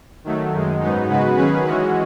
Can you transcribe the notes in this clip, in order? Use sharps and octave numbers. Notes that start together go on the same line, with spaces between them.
D#3 F#3 A3
F#2 D#3 G#3
G#2 F#3 B3 D#4
C#3 G#3 B3 F#4 B4
D#3 F#3 C#4 G#4 B4
E3 G#3 C#4 F#4